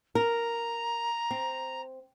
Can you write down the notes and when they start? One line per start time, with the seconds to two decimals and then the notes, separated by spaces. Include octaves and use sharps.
0.15 A#4 A#5
1.31 C4